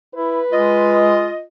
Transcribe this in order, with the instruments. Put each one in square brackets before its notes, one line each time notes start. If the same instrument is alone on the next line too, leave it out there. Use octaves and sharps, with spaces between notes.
[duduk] E4 [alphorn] B4
[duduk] G#3 [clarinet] F4 [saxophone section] D#5